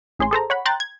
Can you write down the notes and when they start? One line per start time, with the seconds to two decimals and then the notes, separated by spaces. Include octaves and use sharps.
0.19 A1 G#4 C#5 C6
0.31 G#4 A4 C5 A#5
0.50 C#5 F#5 B5
0.65 G5 A#5 C6 F#6 G6 A6
0.80 G#6